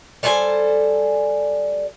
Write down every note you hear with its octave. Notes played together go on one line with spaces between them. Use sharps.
G3 A4 C5 G#5